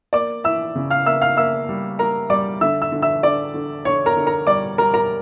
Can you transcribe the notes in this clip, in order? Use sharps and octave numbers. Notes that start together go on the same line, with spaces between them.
A#3 D5 D6
E3 E5 E6
C#3
F5 F6
A#3 E5 E6
F5 F6
A#3 E5 E6
G3
A#3 A#4 A#5
G3 D5 D6
D3 E5 E6
E5 E6
D3
E5 E6
D3 D5 D6
D3
D3 C#5 C#6
A#4 A#5
D3
A#4 A#5
G3 D5 D6
G3 A#4 A#5
A#4 A#5